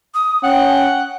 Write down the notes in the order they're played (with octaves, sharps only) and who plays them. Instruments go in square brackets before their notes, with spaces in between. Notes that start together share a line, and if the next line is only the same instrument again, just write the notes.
[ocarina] D#6
[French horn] C#4 [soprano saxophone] F#5 [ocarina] G5